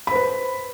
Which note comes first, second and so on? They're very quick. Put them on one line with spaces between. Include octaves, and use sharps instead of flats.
B5 C5 B4